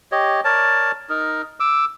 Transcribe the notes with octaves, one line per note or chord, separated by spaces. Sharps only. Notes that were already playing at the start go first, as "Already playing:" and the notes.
G4 C#5 D#5
A#4 C#5 D5 A5
D#4 A#4
D6 E6